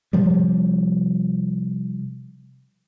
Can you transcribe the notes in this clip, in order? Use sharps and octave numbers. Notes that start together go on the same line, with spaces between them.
C3 F3 G3